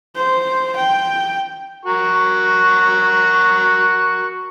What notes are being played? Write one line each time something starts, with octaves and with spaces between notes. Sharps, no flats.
C5
G5
F#4 A#4 C#6